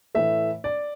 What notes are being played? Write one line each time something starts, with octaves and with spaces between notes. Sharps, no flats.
A2 E3 A3 E5
D5